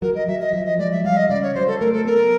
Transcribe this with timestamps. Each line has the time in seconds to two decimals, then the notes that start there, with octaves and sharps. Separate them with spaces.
0.02 F#3 A#4
0.15 D#5
0.28 F#3 E5
0.41 D#5
0.53 F3 E5
0.66 D#5
0.79 G#3 D5
0.92 E5
1.05 G3 F5
1.17 D#5
1.29 C#3 D5
1.43 C#5
1.55 F#3 C5
1.67 A4
1.80 A3 A#4
1.93 A4
2.05 B3 A#4